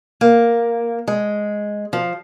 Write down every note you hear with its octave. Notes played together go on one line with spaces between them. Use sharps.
A#3
G#3
F3